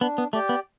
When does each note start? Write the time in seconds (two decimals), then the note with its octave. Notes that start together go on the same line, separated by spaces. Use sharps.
0.01 B3 D4
0.18 B3
0.33 A3 G4 D5 G5
0.49 B3